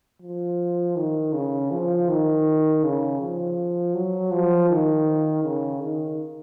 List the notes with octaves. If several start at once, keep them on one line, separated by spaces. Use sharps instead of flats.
F3
D#3
C#3
F3
D#3
C#3
F3
F#3
F3
D#3
C#3
D#3